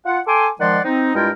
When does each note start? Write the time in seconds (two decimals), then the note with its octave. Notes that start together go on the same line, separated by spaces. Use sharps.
0.06 F4 F#5
0.27 A4 G5 G#5 C6 D6
0.60 D#3 F3 G#3 D5 F#5 C6
0.85 C4 D#4
1.15 G2 G#3 E4 F4 A#4 G5